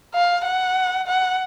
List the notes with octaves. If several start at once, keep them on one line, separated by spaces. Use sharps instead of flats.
F5
F#5
F#5